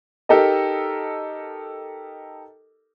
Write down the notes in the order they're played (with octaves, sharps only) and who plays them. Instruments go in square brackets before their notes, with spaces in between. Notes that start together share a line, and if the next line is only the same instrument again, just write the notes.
[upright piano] D#4 G4 A4 A#4 D#5